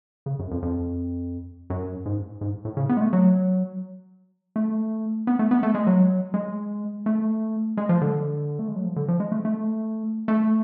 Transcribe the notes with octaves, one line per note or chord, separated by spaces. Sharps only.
C#3
F#2
F2
F2
F#2
G#2
G#2
A2
C#3
B3
G#3
A3
F#3
A3
B3
A3
B3
A3
G#3
F#3
G#3
A3
G#3
F3
D3
A3
G#3
F#3
F3
D3
F3
G#3
A3
A3
A3